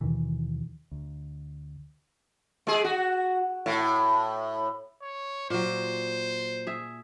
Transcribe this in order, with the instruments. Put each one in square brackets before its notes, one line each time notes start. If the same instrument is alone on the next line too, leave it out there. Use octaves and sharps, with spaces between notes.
[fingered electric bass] D#2 B2 D#3 E3
D2
[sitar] G#3 G#4
F#4
A2
[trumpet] C#5
[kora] A#2 F#3 [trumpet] C5
[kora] G#4 E5